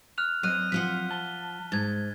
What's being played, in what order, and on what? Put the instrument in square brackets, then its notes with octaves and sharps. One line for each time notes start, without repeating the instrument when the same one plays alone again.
[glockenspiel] F6 F#6 F7
[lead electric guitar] F#3 C4 [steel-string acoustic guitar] D#5 [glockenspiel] F#6 D#7 F7
[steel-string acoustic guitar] F3 F4 F#5 [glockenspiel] B6
[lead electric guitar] A5 [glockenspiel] G7
[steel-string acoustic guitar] G#2 [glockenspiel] G#6 A6